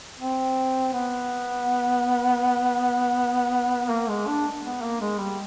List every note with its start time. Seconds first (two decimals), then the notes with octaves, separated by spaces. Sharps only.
0.20 C4
0.93 B3
3.90 A#3
4.09 G#3
4.27 D4
4.64 B3
4.82 A#3
5.01 G#3
5.19 G3